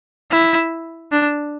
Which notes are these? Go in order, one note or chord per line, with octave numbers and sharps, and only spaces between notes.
E4
D4